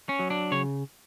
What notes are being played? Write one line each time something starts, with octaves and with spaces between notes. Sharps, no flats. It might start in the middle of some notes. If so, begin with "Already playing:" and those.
C#4
F#3
D4
C#3 C#5